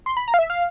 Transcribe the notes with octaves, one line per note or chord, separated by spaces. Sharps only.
C6
B5
A#5
F5
E5
F5